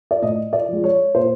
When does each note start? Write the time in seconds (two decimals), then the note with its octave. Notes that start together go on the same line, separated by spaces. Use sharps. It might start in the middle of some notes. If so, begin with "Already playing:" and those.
0.11 D5
0.22 A2 D#5
0.53 D5
0.69 F3 G#3
0.84 C#5
1.15 A#2 C5